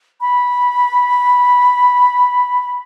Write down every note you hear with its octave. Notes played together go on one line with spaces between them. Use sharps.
B5